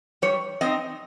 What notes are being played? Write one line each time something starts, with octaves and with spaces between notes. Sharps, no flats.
G3 C#5
C4 D#4 D#5